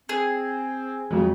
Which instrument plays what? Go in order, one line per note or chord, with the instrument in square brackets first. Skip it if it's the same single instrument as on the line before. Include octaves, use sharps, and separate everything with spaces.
[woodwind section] C4 [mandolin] G#4
[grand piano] F2 F#3 [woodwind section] C#3 [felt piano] G#3